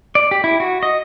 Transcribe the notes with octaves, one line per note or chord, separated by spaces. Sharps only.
D5
G4
E4
F#4
D#5